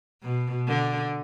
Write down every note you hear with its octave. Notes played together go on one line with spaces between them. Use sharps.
B2
D3